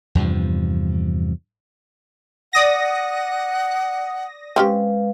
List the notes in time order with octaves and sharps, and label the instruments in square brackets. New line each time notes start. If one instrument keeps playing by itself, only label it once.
[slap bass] E2 G2 C3 F3
[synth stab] D5 D#6 A#6 [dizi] F#5
[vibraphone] G#3 B4 F5 [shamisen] C4 C#4 G4